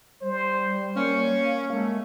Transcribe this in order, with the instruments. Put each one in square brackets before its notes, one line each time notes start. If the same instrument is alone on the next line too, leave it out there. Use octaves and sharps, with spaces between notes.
[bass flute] G3 [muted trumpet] C5
[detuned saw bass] A#3 [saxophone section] C#4 [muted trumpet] C#6
[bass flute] F5
[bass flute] G#3 [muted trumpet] A3